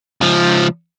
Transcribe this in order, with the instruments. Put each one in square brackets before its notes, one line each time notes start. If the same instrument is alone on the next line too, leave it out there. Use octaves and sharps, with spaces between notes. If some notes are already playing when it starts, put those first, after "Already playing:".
[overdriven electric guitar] C#2 F3